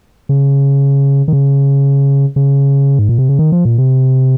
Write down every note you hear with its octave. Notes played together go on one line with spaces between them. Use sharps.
C#3
D#3
C#3
C#3
G#2
A#2
C3
C#3
D#3
F3
A#2
C3